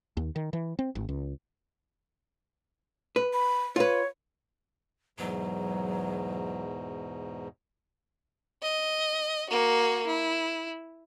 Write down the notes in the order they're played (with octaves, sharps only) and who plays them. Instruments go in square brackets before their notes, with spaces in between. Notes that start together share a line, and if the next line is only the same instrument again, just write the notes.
[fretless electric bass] D#2
D#3
E3
C4
G#1
C#2
[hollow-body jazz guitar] B4
[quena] B5
[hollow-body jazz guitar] F4 B4 [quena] C#5
[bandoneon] E2 G#2 B2 [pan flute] F#3
[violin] D#5
A#3 F#4
E4